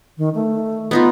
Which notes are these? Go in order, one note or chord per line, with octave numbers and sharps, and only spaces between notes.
D#3
A3
B3 D#4 F4